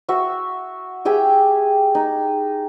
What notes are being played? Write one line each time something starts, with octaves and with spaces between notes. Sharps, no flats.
F#4 E5
G4 G#4 E5 G5
D#4